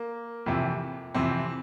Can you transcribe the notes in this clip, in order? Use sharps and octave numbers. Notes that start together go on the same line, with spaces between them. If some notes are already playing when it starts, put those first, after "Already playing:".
Already playing: A#3
F2 C3 E3
F2 C3 E3 C4